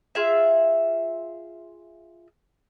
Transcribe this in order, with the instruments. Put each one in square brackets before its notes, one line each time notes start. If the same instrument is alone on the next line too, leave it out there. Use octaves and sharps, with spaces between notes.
[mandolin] F4 G#4 E5